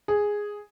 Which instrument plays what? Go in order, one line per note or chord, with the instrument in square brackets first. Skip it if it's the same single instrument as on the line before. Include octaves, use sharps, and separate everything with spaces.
[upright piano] G#4